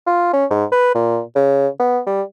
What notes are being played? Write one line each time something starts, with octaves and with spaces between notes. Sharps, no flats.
F4
C#4
G#2
B4
A#2
C#3
B3
G3